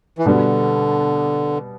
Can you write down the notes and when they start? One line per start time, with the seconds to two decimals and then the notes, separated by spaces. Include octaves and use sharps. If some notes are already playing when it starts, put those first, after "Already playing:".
0.18 E3
0.26 B2 D3 G3 B3 D4